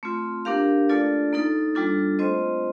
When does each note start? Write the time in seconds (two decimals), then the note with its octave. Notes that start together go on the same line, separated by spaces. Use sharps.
0.03 A3 C4 F4
0.45 A#3 D4 G4 A#4 F5
0.89 A3 D4 F4 A4 D5
1.32 A#3 D#4 A4
1.75 G3 A#3 D4 F4 A4
2.19 A3 C4 F4 C5 D#5